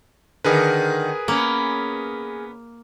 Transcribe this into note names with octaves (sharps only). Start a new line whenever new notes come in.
D3 D#3 G#4 A#4 B4
A#3 B3 C#4